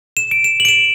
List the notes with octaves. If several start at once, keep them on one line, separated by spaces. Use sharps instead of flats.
E7
D7
E7
F#7
D7
E7